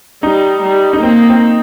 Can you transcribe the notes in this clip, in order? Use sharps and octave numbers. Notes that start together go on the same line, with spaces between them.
G3 D#4
G3
D#4
A#3 C4
C4